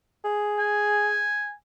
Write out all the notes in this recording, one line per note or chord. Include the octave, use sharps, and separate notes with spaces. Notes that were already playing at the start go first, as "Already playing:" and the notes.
G#4
G#5